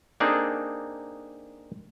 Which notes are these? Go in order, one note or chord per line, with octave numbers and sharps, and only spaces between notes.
A#3 C4 D4 D#4 G#4 A4